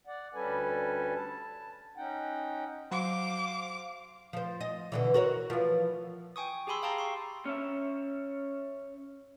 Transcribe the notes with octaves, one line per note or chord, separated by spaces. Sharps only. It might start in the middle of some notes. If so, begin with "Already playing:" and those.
D5 F#5
D2 G3 C#4 A4 B4 G#5
A5
C#4 D#4 F#5 G5
F#3 C5 F5 D6
F3 C5
D#5
B2 D3 E3
F#4 A#4 C#5
E3 F3
G5 G#5 C#6 D#6
G4 G#4 G#5 B5 C6 E6
F5 G5 A5 A#5 C6
C6 C#6
C#4 C#5 E5